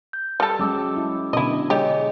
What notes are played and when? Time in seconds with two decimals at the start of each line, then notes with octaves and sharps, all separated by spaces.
0.13 G6
0.40 G3 A4
0.59 F#3 G#3 C#4 D6 E6
0.96 E4
1.33 B2 D3 E4 D#5
1.70 G#3 G4 G#4 C#5 D#5